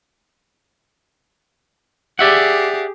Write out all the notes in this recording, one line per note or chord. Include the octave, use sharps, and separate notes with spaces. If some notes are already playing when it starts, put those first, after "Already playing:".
G4 G#4 D5 E5 F#5